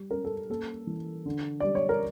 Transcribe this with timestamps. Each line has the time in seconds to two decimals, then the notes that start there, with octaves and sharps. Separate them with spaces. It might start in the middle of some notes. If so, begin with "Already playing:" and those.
Already playing: G3
0.11 C#4 A#4
0.25 A4
0.50 A#3 A4
0.87 E3
1.26 D3
1.60 G3 D5
1.75 C#5
1.89 A#4